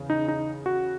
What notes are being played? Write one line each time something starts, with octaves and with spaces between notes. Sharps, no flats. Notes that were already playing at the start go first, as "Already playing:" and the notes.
Already playing: E2 C#3
D#4
D#4
F#4